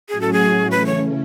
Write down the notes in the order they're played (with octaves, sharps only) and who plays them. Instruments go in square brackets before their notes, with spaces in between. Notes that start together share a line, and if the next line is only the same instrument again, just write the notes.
[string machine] A2 F#3 A3 C#4 F#4 [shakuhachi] G#4
[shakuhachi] A4
G#4
[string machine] C#3 E3 A3 C#4 [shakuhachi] B4
[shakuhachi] C#5